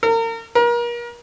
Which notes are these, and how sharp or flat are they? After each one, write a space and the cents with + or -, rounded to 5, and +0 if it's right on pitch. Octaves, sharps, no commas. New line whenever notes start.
A#4 -35
A#4 +35